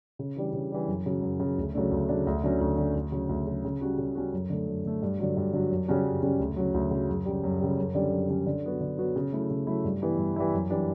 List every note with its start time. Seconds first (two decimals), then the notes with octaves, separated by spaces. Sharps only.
0.19 C#3
0.36 E3 G3 D4
0.53 C#3
0.71 E3 G3 D4
0.88 F#2
1.06 C#3 F#3
1.22 F#2
1.40 C#3 F#3
1.58 D2
1.74 C#3 F#3 A3 D4
1.91 D2
2.08 C#3 F#3 A3 D4
2.27 D2
2.43 D3 F#3 C#4
2.61 D2
2.78 D3 F#3 C#4
2.95 D2
3.12 C#3 F#3
3.29 D2
3.47 C#3 F#3
3.65 C#3
3.81 G3 C#4 F#4
3.98 C#3
4.15 G3 C#4 F#4
4.33 F#2
4.50 D3 A3
4.68 F#2
4.85 D3 A3
5.02 G2
5.19 D3 F#3
5.37 G2
5.53 D3 F#3
5.71 F#2
5.88 C#3 G3 C#4 F#4
6.05 F#2
6.23 C#3 G3 C#4 F#4
6.40 D2
6.57 C#3 F#3
6.74 D2
6.91 C#3 F#3
7.09 F#2
7.25 C#3 G3
7.44 F#2
7.60 C#3 G3
7.78 F#2
7.95 D3 G3 C#4
8.12 F#2
8.29 D3 G3 C#4
8.47 D3
8.64 F#3 B3 F#4
8.81 D3
8.98 F#3 B3 F#4
9.16 C#3
9.33 F#3 A3 E4
9.50 C#3
9.67 F#3 A3 E4
9.84 G2
10.02 E3 G3 B3 E4
10.18 G2
10.36 E3 G3 B3 E4
10.54 F#2
10.70 E3 G3 D4